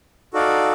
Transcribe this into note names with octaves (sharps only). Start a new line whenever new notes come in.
D#4 F#4 A4 D5 F5